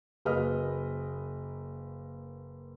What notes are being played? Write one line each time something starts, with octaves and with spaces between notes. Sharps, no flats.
F#1 A#3 B4 D#5 D#6 F6